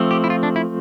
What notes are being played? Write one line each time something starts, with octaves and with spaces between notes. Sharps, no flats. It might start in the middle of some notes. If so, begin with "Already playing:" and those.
Already playing: F3 A3 C4
G4
E4
F4
D4
E4